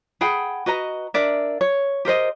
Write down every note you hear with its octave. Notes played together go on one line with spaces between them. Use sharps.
G#4 F#5 G5 B5
F#4 B4 D#5 A#5
D4 A#4 D5 E5
C#5
G4 A#4 C5 D#5